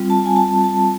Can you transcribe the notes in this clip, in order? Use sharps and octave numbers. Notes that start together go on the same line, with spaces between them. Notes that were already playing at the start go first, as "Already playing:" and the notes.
Already playing: G3 C4 F4
A5
G#5
A5
A5